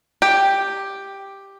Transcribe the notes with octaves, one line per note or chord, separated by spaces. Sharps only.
G4